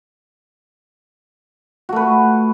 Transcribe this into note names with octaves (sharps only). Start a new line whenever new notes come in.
A3 F#4 B4